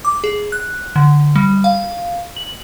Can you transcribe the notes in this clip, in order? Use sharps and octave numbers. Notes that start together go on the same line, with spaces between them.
D6
G#4
F#6
D3
G3
F5
F#7